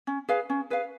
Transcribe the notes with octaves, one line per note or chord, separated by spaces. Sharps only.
C#4
G#4 B4 F5
C#4
G#4 B4 F5